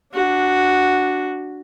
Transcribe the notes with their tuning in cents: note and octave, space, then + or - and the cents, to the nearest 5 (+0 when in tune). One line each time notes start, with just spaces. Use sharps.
D4 +0 F#4 +0